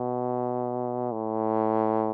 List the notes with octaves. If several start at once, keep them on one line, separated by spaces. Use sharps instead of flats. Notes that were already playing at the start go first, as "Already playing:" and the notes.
Already playing: B2
A2